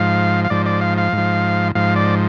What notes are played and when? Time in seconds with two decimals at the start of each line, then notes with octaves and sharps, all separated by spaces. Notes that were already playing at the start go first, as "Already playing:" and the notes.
Already playing: G#2 F3 F5
0.45 F5
0.50 G#2 F3 D5
0.66 D5
0.81 F5
0.98 F5
1.13 G#2
1.18 F3
1.75 G#2 F3 F5
1.96 D5